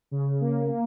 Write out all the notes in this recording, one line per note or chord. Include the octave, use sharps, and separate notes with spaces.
C#3
A#3
A#3